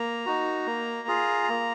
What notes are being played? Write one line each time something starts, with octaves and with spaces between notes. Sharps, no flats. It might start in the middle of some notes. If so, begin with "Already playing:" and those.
Already playing: A#3 A#5
D#4 F#4
A#3
F4 G#4
A#3